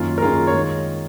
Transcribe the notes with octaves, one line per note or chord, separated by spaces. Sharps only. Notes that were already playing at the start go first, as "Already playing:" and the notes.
Already playing: F#2 D#3 A#3 C#4 F4
A#4
F#2 D#3 A#3 C#4 F4 G#4
C#5
D#3 G#3